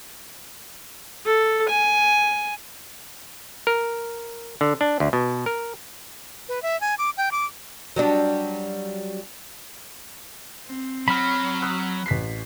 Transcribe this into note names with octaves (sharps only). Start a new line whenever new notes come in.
A4
G#5
A#4
D3
D4
D2
B2
A#4
B4
E5
G#5
D6
G5
D6
F#3 G3 D4
C4
F#3 B5 F6
D#6 E6 F#6
A1 B6 C7